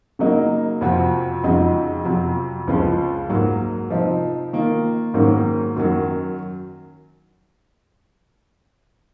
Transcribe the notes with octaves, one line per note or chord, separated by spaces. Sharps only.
C#3 F#3 A#3 D#4
F2 C3 F3 C4 F#4
F2 C#3 G#3 D#4 F#4
F2 C3 F#3
C#2 C#3 F3 G#3
G#2 F#3 A#3
C3 F3 C4 D#4
D#3 A#3 F4
G#2 D#3 F#3 A#3 C#4
F#2 D#3 F#3